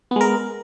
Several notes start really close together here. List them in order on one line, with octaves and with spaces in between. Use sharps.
B3 G#3 A#4